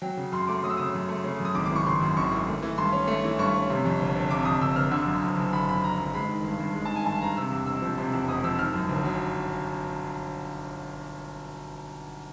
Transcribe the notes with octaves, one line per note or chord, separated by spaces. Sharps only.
F#3 G5
C#3
F#2 C6
A3 D6
F#3 D#6
E6
C#3 D#6
F#2
A3
C#3
F#2
D#6
G#1 D6
D6
E3 C#6
C#3 C6
F#2
G#1 C#6
E3
A3
E3
G2 C6
C#4
A3
E3
G2 C#6
C#4
C3
F2
G1
G1
C3 D6
F2 D#6
G1 E6
G1 F6
D3 E6
F#2
F#1
F#1
D3 B5
F#2 B5
F#1 A#5
F#1
G#3 B5
D#3
G2
G2
G#3
A5
D#3
G#5
G2 A5
G2 A#5
C3 E6
E2
E1 E6
F3
C3
E2
E1 D#6
F3 E6
D#3 F6
F#2
G1
F#3